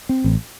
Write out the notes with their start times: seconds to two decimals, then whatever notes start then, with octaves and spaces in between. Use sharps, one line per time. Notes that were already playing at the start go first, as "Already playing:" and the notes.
0.09 C4
0.24 A1